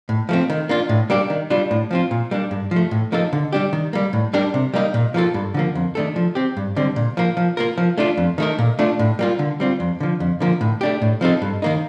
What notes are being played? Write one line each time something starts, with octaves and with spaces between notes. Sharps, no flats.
A2
F3 A3 C4
D#3
A#3 D4 F4
A2
G3 A#3 D4 G4
D#3
G3 D4 F4
A2
F3 C4 F4
A#2
G3 A#3 D4
G2
F3
A3
A2
F3 A#3 D#4 A4
D3
G3 D4 G4
D#3
G3 A#3
A2
G3 D4 G4 A#4
C3
G3 A#3 D#4
A#2
F3 A#3 F4 A4
G2
D3 F3 A#3
F2
D#3 A3 D4 A4
F3
C4 G4
G2
D3 G3 C4
A#2
F3 A#3
F3
A#3 F4 A#4
F3
A3 D4 F4
F2
D#3 A3 D#4 A#4
A#2
A3 D4 F4
A2
G3 A#3 F4
D3
G3 C4 F4
F2
D3 F3
F2
D3 F3 A#3
A2
A3 D4 G4
A2
F3 C4 D#4 A4
G2
D#3 A#3 D#4